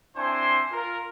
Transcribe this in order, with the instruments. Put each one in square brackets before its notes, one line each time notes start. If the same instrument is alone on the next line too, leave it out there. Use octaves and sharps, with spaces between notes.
[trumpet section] C4 D4 E4 C5 G#5 C6
F4 A#4